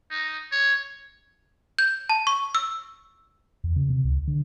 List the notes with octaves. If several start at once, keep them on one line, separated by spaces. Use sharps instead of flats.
D#4
C#5
G6
A5
C#6
E6
E2
C#3
C3
C#2
D3